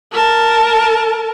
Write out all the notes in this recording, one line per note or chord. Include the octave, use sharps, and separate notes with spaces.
A#4 A5